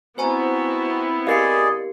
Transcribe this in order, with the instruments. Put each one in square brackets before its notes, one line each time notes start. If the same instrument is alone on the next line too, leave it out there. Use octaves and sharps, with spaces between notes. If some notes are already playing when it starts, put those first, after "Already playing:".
[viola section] B3 C4 E4 [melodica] F#4 [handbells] C5 G#5 A#5
[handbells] G4 C7 C#7 [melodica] G#4 D5 D#5 [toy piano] A#4 F5